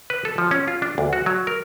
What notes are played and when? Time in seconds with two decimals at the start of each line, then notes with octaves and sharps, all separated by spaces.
0.10 B4
0.25 A4
0.38 F3
0.51 C#4
0.68 F4
0.82 D4
0.98 D2
1.13 F#4
1.26 F#3
1.47 A#4